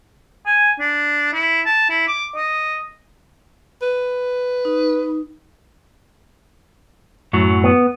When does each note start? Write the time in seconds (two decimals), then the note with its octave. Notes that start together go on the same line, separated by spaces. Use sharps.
0.46 G#5
0.80 D4
1.34 E4
1.66 A5
1.90 E4
2.08 D6
2.36 D#5
3.82 B4
4.65 D#4
7.33 F#2 A2 F#3
7.64 B3